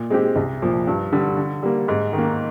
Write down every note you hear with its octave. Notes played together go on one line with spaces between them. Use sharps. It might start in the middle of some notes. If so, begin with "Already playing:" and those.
Already playing: A#2
G#3 C4 G4
C2
A#2 F3
G2
D3 G3
D3
G3 A#3
G#2
D#3
A#3